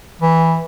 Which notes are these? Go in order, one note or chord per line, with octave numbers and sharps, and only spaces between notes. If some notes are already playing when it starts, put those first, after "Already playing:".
E3